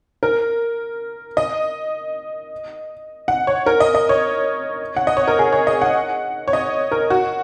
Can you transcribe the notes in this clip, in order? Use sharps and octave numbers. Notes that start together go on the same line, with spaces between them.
A#4
D#5
F#5
C#5
A#4
D#5
D#5
C#5
F#5
D#5
C#5
A#4
G#4
C#5
D#5
F#5
C#5
D#5
A#4
F#4